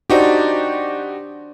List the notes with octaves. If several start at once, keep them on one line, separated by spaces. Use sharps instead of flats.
D4 D#4 F#4 G4 C5 D5